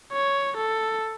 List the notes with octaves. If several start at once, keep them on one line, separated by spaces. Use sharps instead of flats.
C#5
A4